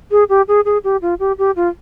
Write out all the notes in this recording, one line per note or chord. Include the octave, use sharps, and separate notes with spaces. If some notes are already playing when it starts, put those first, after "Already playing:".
G#4
G4
G#4
G#4
G4
F4
G4
G4
F4